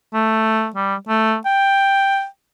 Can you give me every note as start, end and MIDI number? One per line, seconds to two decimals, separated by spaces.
0.13 0.68 57
0.76 0.95 55
1.08 1.36 57
1.46 2.25 79